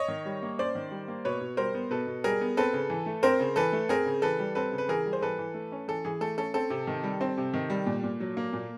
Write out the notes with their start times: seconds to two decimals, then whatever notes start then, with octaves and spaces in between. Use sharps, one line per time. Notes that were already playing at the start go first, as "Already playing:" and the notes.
Already playing: C#5 D#5
0.08 D#3
0.25 G3
0.43 A#3
0.58 C#4 C5 D5
0.75 D#3
0.91 G3
1.08 A#3
1.25 B2 B4 C#5
1.41 B2
1.57 G3 A#4 C5
1.74 B3
1.90 B2 A4 B4
2.07 B2
2.24 G3 G#4 A#4
2.41 B3
2.57 C4 A4 B4
2.73 C#3
2.90 E3
3.06 A3
3.23 C4 A#4 C5
3.40 C#3
3.56 E3 A4 B4
3.73 A3
3.89 C4 G#4 A#4
4.06 C#3
4.22 E3 A4 B4
4.39 G3
4.55 C4 A4 B4
4.72 C#3
4.78 B4
4.88 E3 G#4 A#4
5.06 G3
5.13 C5
5.21 E3 A4 B4
5.39 E3
5.54 A3
5.72 C#4
5.88 E3 A4
6.05 E3 G#4
6.21 A3 A4
6.37 C#4 A4
6.54 C4 A4
6.70 C3
6.87 D#3
7.03 G3
7.21 C4
7.38 C3
7.54 D#3
7.70 G3
7.86 A#2
8.03 A#2
8.20 F#3
8.37 A#3
8.53 A#2